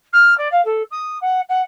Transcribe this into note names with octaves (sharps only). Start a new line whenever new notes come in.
F6
D5
F5
A4
D#6
F#5
F#5